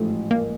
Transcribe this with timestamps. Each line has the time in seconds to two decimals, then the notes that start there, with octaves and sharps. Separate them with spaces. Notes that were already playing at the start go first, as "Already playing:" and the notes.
Already playing: A1 G#2 F3 A3
0.31 A#3